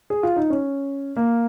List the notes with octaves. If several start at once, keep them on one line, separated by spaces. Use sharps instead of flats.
G#4
F4
D#4
C#4
A#3